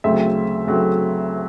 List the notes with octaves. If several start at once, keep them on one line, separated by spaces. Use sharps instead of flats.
D2 C#3 F#3 A3 C4 E5
D2 C#3 F#3 A3 C4